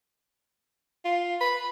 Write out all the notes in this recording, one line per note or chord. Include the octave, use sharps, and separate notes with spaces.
F4
B4